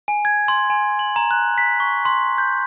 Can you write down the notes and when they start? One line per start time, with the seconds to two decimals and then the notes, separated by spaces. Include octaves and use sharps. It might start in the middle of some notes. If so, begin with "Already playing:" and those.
0.08 G#5
0.25 G#6
0.48 C6
0.70 G#5
0.99 F#7
1.16 A#5
1.31 F#6
1.58 B6
1.80 C#6
2.05 C6
2.38 G6